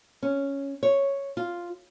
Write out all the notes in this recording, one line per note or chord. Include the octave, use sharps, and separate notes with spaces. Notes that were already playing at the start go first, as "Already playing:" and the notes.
C#4
C#5
F4